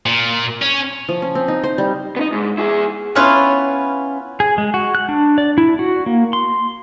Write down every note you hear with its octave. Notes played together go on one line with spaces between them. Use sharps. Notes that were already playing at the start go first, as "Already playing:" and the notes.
A#2
C#4
F3
C#4
C4
D#4
C5
G3
B3 D#4
G#2
E4 G#4
B3 C#4 E4 F4 B4
G#4
G#3
F#4
F#6
D4
D5
E4
F#4
A#3
C6